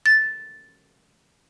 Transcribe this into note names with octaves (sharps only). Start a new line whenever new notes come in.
A6